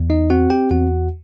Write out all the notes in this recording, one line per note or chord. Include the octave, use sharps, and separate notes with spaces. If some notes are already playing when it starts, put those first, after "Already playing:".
Already playing: E2
D#4 D#5
C4 F#4 F#5
G4 G5
E2 F#4 F#5